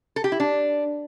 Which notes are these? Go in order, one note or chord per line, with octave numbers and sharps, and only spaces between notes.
A4
G4
E4
D4